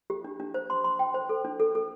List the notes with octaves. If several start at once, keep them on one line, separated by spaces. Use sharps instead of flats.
G4
D4
D4
C5
C6
C6
G5
C5
A4
D4
A4
A4